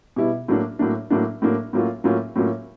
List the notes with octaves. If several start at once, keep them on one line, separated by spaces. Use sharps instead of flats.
B2 G3 B3 E4
A2 F#3 A#3 D4
A2 F#3 A#3 D4
A2 F#3 A#3 D4
A2 F#3 A#3 D4
A2 F#3 A#3 C#4 F4
A2 F#3 A#3 C#4 F4
A2 F#3 A#3 C#4 F4